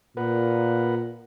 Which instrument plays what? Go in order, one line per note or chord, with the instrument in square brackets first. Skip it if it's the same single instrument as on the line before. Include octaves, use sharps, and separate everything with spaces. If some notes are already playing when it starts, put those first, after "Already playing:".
[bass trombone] A#2 [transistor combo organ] A#4 B4 F#5